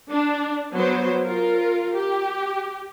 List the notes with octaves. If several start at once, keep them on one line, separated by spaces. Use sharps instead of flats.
D4
F#3 B3 C5
F4 A#4
G4